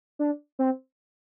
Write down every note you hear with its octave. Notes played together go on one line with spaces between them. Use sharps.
D4
C4